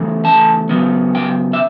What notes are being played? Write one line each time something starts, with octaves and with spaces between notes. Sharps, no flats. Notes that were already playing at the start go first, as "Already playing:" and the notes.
Already playing: C#3 E3 A3
A5
C#3 F#3 B3
G5
E5